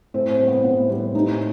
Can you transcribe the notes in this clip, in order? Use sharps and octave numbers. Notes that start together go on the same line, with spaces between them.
A2 C4
G3 C4
B3
A2 B3
G3 C4
A2 D#4